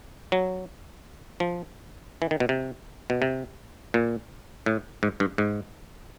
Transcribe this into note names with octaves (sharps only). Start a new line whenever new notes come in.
F#3
F3
E3
D#3
B2
C3
B2
C3
A#2
A2
G#2
G2
G#2